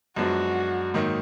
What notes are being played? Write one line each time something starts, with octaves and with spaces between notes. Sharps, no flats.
F#2 F3 G#3 B3 D4 F#4
G#2 D#3 F#3 A#3 D#4